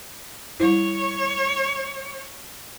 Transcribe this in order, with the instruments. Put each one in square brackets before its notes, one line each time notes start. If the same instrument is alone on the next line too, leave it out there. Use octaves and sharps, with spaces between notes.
[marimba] G3 E4 [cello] C#5